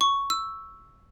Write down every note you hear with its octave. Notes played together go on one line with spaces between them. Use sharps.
C#6
E6